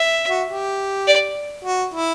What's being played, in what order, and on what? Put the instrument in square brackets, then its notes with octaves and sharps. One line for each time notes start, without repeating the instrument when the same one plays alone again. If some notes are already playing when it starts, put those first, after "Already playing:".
Already playing: [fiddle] E5
[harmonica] F#4
G4
[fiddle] D5
[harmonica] F#4
E4